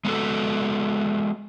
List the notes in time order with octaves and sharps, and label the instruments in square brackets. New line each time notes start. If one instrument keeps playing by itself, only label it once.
[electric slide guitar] G#3 B3 F#4 A4